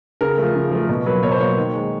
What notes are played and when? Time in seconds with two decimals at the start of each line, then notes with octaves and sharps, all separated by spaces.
0.21 C#3 A#4
0.38 F3 A3
0.55 C#3
0.71 F3 A3
0.89 B2
1.06 F#3 A#3 B4
1.23 B2 C#5
1.31 C5
1.40 F#3 A#3 C#5
1.57 D#3
1.74 G#3